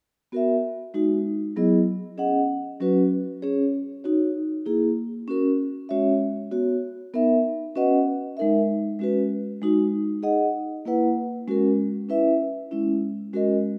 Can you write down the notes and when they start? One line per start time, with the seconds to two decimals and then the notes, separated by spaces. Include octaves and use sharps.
0.32 B3 F#4 A#4 E5
0.94 G#3 D#4 F#4
1.56 F#3 B3 E4 G#4 D#5
2.18 C#4 G#4 D#5 F#5
2.80 F#3 C#4 F#4 B4
3.42 C#4 G#4 C#5
4.04 D#4 F#4 C#5
4.66 A#3 E4 G#4
5.28 C#4 F#4 A#4
5.89 G#3 C#4 F#4 C#5 E5
6.51 B3 F#4 C#5
7.14 B3 D#4 A#4 E5
7.75 C#4 F#4 B4 D#5 F#5
8.37 G#3 D#4 A#4 E5
8.99 G#3 C#4 F#4 B4
9.62 G#3 D#4 F#4
10.23 D#4 G#4 D#5 F#5
10.86 A#3 E4 B4 F#5
11.48 G#3 C#4 F#4 A#4
12.09 C#4 E4 B4 E5
12.71 G#3 C#4 E4
13.33 G#3 C#4 F#4 A#4 D#5